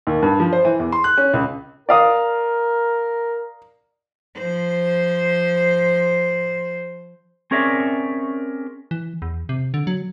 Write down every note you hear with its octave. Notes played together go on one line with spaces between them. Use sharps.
D#2
G2
F3
C5
E3
E2
C6
F#6
C#4
C#2
A#4 D5 F5 D#6
F3 C5
C4 C#4 G#4 A#4 D5 E5
E3
E2
C3
D3
F#3